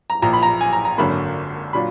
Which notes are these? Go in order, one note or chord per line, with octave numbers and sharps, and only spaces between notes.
A#5
A#1 A#2 F3 A#5
B5
A#5
G#5
A#5
A#5
G#1 F#2 D3 F#3 A#3 B5
A#2 F#3 D4 F4 B5